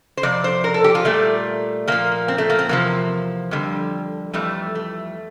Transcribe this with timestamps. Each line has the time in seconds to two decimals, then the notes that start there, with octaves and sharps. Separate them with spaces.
0.17 C5
0.23 F2 C3 D5
0.44 C5
0.64 A#4
0.74 A4
0.84 G4
0.95 F4
1.05 A#2 G3 A3
1.87 A#2 F3 A#3
2.28 C4
2.38 A3
2.50 A#3
2.59 C4
2.69 E2 C3 F3 A#3
3.51 F2 D3 G3
4.33 F2 E3 G3 A3
4.75 A3